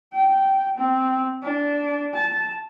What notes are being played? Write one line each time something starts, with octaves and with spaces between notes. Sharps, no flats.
G5
C4
D4
A5